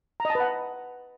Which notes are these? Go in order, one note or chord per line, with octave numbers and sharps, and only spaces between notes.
A#5
D#5
A5
B4
F#5